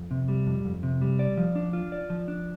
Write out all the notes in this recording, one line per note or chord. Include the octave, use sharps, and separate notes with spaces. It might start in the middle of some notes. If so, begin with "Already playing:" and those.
Already playing: F2
C3
G3
F2
F2
C3
G3
D5
F3
D4
F4
D5
F3
D4